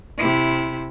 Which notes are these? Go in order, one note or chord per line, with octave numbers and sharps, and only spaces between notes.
C3 E4